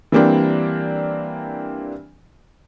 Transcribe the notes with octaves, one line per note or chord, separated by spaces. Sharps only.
E3 G3 A#3 C4 D4